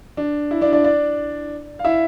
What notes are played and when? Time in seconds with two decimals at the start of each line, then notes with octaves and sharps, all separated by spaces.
0.17 D4
0.51 E4
0.61 D4 D5
0.72 D4 D5
0.84 D4 D5
1.79 F5
1.84 E4 E5